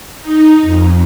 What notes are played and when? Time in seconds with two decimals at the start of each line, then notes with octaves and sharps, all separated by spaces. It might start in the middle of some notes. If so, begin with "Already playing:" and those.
0.20 D#4
0.62 F2